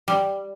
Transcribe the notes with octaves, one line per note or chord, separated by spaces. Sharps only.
G3